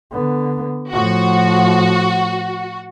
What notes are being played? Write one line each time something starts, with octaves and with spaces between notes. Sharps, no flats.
D3 B3
A2 F3 F#4